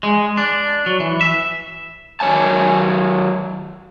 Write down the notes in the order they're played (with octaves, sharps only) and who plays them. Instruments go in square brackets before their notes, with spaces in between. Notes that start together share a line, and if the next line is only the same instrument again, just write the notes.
[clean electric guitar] G#3
D4
F#3
E3
E5
[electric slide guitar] D#3 F#3 C#5 G#5 A5